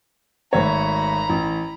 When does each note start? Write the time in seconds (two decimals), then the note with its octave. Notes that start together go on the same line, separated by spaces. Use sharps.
0.53 G#1 A3 C#5 A#5 B5
1.29 A1